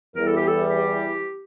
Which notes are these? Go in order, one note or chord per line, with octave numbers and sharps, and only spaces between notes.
E2 E3 G3 A#4
A4
G4
A4
G4